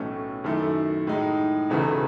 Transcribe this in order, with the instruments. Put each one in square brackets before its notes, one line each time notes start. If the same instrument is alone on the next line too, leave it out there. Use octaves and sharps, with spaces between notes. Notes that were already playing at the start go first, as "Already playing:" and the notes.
Already playing: [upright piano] B1 A2 E3 A3 C#4
F#2 D#3 A3 E4
A2 G#3 D#4
E1 E2 C#3 E3 A3